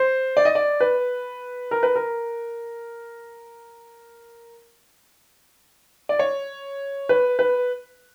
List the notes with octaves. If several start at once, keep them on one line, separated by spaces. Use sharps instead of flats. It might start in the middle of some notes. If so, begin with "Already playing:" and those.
Already playing: C5
D5
D#5
D5
B4
A#4
B4
A#4
D5
C#5
B4
B4